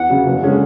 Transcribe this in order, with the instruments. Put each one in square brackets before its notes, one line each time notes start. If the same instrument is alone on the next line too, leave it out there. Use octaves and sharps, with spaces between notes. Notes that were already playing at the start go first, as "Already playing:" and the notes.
Already playing: [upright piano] E2 [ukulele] F#5
[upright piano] C#3 F#3
F#1
D3 G#3 C#4